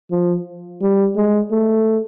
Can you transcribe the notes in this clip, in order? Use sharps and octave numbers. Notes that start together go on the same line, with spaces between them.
F3
G3
G#3
A3